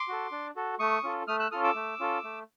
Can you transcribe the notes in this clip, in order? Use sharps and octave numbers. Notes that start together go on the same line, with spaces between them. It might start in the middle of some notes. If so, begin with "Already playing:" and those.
Already playing: C6 D6
F#4 A4
D4
F#4 A4
A3 C#6 D#6
C#4 F4 A4
A3 D#6 F6
E6 F#6
C#4 F4 A4 D#6 F6
D6 E6
A3
C#4 F4 A4
A3